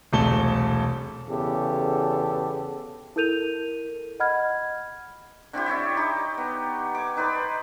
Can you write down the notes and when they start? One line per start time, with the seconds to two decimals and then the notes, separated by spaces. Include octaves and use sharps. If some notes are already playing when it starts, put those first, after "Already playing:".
0.13 E1 C2 A3 A5 G7
1.29 E2 C#3 B3 G4 A4
3.16 E4 A4 A#4 G6 D#7 F7
4.20 D#5 F#5 B5 F6 G#6
5.53 D3 C4 E4 G4
5.66 E4 C#5 D5 E5
5.97 D#4 G4
6.38 B3
6.95 G#5 D6
7.17 D#4 B4 C5 D5